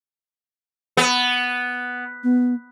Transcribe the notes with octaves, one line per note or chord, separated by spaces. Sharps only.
B3
B3